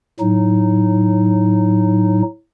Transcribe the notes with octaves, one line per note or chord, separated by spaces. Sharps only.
A2 F#3 D#4